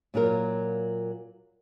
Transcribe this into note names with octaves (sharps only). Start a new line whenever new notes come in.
A#2 F#3 F4 A#4